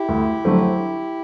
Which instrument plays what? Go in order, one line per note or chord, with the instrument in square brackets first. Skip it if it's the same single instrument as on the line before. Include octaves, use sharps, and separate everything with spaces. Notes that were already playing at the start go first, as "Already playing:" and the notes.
Already playing: [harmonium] E4 G4
[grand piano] D2
D3 F#3 A3 C4